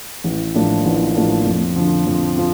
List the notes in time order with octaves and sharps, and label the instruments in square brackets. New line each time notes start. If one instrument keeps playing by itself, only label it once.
[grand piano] A1
A2 F3 A#3 D4
A1
A2 F3 A#3 D4
F2
D3 F3
F2
F3